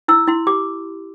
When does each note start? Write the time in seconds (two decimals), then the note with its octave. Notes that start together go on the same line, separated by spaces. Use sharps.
0.08 E4 E6
0.27 E4 C6
0.47 G4 D6